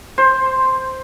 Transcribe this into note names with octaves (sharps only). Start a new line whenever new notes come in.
C5